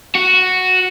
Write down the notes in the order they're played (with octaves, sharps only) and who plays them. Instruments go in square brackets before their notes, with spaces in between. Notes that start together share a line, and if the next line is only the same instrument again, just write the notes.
[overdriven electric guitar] F#4